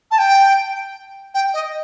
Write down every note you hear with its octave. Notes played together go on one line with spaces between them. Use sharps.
A5
G5
G5
D#5